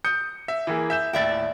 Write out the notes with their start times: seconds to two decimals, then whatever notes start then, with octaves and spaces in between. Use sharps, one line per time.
0.05 D#6 G6 C#7
0.48 E5
0.67 E3 A#3 G#4
0.90 E5 G6 E7
1.13 D#1 A2 D5 E5 G5 A6